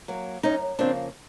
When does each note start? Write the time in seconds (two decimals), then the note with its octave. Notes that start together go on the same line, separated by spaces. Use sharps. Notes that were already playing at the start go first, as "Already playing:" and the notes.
0.08 F#3 A#3
0.43 F#2 C#4 D#4
0.79 C#3 F3 A#3 C4 D4